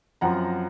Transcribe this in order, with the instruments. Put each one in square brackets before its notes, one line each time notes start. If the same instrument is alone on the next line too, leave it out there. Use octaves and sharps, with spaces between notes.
[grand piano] F#2 F3 C4 F#5 A#5